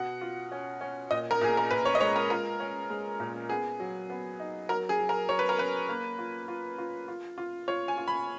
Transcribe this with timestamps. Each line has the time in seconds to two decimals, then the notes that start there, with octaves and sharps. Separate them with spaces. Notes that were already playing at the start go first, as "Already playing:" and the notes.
Already playing: B2 F#5
0.21 F4
0.52 C#4
0.81 C#4
1.11 A#2 D#5
1.31 A#4
1.41 A#2 G#4
1.57 A#4
1.71 A#2 B4
1.85 C#5
1.95 D#5
2.01 G#3 C#5
2.16 A#4
2.30 F4 A#4
2.60 C#4
2.90 G#3
3.20 A#2
3.49 B3 G#4
3.80 F#3
4.10 B3
4.40 D#4
4.69 F#3 A#4
4.89 G#4
4.99 F#3
5.09 A#4
5.29 F#3 C#5
5.39 B4
5.49 A#4
5.59 C#4 B4
5.89 A#3
6.19 F4
6.48 F4
6.78 F4
7.08 F4
7.38 F4
7.68 F4 C#5
7.88 G#5
7.98 F4
8.08 B5